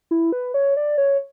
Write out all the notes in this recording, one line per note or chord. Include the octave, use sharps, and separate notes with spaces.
E4
B4
C#5
D5
C#5